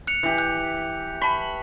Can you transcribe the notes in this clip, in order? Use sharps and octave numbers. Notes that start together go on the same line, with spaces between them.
F#6 C#7 F7
E3 G4
F#6
A5 B5 C#6